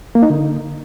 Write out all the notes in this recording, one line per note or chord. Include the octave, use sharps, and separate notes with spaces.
A#3
D#4
D3